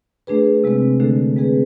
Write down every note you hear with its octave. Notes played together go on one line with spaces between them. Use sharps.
A3 D4 G#4 B4
C3 G#3 C4
D3 A3 D4 A4
G#3 C4 G#4 B4